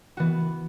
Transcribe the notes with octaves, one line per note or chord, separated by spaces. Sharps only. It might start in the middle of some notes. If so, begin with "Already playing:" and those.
E3 B3 F#4